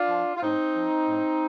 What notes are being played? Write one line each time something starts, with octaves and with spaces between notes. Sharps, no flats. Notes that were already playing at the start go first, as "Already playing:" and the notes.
Already playing: D4 F4
F3
F4
A2 C4 D#4
F3
A2